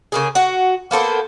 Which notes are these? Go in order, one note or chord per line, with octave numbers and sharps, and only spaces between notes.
C#3 A#3 G#4
F#4
A#3 B3 A4 C5